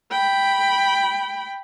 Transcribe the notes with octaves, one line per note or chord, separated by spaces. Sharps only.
G5 B5